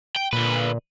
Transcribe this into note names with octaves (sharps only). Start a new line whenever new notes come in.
G5
A#2 D3 B4